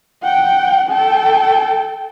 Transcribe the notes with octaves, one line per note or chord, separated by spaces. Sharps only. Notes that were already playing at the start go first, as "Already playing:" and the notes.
F#5 G5
A4 G5